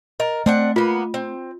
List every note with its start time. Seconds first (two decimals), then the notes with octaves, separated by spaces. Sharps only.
0.20 A#4 D#5
0.46 A3 C4 D4 F#5
0.76 A#3 B3 F4
1.14 C4